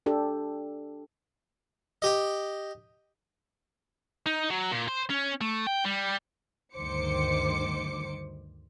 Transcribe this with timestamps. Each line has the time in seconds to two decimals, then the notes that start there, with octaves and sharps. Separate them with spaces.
0.06 D4 G4 A4
2.02 G4 D#5
4.27 D#4
4.50 F#3
4.72 A#2
4.88 C5
5.10 C#4
5.41 A3
5.67 G5
5.85 G3
6.76 D2 G2 D#3 C5 D6 C#7